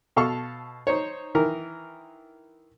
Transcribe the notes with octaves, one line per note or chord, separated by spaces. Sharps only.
B2 A4 F5 A5 C#6
D#4 C5 C#5
D#3 E3 A#4